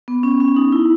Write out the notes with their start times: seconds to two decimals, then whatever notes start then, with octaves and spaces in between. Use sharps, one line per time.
0.08 B3
0.23 C#4
0.40 C#4
0.57 D#4
0.72 E4